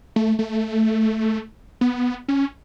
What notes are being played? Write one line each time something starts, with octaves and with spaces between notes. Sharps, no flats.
A3
A3
B3
C#4